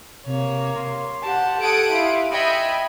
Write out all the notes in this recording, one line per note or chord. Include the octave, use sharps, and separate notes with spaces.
C3 A#3 C#5
C6
G4 F#5 A5
A4 F#5 D#6 G#6 D7
E4 F5 C6
D#5 E5 G5 G#5 B5 C#7